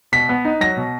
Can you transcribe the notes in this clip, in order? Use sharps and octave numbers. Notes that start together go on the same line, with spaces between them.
B2 B6
B3
D#4
F#3 A#6
B2